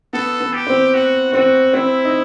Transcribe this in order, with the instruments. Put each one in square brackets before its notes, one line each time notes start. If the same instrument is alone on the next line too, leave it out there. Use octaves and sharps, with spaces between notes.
[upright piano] B3 [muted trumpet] A4
[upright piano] B3
[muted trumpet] G4
[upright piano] C4
[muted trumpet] F#4
[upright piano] C4 [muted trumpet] F#4
[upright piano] C4 [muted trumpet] E4
[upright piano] D#4